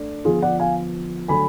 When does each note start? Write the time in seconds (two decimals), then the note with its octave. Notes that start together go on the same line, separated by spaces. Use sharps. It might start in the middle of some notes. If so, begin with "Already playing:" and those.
Already playing: A3 D4
0.25 D3 F3 B3 F4 G#4
0.42 D5 F#5
0.60 F5 G#5
1.28 D3 F#3 A3 G#5 B5